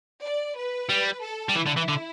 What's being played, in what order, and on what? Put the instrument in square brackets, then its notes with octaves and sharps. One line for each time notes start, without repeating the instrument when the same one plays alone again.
[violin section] D5
B4
[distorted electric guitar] G3
[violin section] A4
[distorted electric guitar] G3
[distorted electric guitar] E3 [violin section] E4
[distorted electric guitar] D3
E3
D3